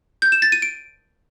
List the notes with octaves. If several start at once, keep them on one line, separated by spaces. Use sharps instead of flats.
G6
E7
A6
D#7
D7